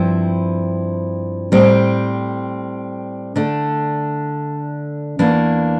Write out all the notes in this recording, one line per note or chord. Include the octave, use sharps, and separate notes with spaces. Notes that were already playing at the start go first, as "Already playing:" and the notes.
Already playing: G2 F3 C4 E4
A2 G3 C4
D3 A3 D4
E2 E3 A#3 D4